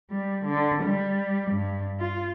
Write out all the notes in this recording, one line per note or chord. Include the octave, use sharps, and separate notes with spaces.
G3
D3
G3
G2
F4